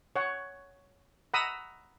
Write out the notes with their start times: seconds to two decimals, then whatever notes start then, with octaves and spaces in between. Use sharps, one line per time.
0.16 C#5 F#5
1.34 F#5 A#5 B5 D#6 E6